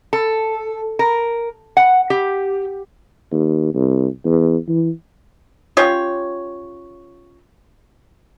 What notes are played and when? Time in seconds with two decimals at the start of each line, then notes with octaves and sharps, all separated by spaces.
0.13 A4
0.99 A#4
1.77 F#5
2.10 G4
3.32 D#2
3.74 C2
4.25 E2
4.68 E3
5.77 C#4 F4 G4 C#5